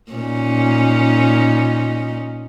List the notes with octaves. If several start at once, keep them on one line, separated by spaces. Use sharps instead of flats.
A#2 C#4 D#4